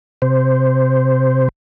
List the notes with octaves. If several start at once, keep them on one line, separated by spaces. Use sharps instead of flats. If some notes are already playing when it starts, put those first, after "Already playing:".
C3 C5